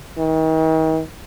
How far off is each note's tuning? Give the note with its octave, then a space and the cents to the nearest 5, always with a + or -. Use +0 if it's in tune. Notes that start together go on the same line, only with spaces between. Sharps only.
D#3 +40